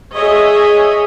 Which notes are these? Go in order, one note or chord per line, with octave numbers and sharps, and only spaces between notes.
G#4 C#5 D#5 E5